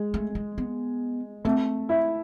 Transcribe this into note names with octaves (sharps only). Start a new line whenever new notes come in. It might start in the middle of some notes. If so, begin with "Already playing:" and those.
Already playing: G#3
A3
G#3
B3
A3 C4
E4